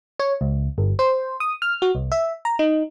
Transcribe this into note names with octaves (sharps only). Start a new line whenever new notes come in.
C#5
C#2
G1
C5
D#6
F6
F#4
C2
E5
A#5
D#4